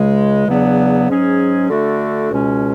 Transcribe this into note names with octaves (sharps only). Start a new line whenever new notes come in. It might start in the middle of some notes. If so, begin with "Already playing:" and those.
Already playing: C#2 C#3 G#3
E2 C#3 F#3 B3 D4
G#2 F#3 C#4 G#4
D3 A3 D4 F#4 A4
C#2 B2 G#3 C#4